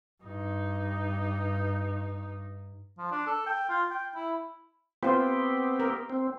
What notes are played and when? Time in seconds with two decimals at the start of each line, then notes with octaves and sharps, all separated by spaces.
0.23 G2 D#4
2.98 F3
3.11 D4
3.27 A4
3.46 G5
3.69 F4
3.90 G5
4.15 E4
5.03 B3 C4 F4 G4 C5
5.80 A#4
6.10 C4